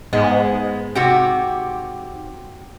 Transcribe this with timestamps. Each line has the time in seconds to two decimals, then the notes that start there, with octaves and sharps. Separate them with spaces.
0.13 G#2 G#3 B3
0.95 C3 F#4 G4